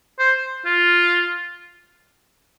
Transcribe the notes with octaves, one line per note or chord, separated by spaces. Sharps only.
C5
F4